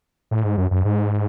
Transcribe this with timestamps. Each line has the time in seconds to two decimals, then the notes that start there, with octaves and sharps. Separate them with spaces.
0.31 A2
0.44 G#2
0.57 F#2
0.71 F#2
0.85 G#2